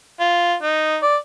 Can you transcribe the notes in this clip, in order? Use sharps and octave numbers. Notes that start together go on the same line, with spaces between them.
F4
D#4
D5